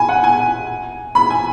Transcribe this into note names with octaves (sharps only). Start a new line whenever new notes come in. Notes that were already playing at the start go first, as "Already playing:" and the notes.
Already playing: G#5 B5
F#5
G#5
B5
G#5